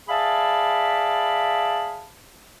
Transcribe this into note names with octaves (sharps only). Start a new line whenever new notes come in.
G#4 D5 E5 F5 A5 B5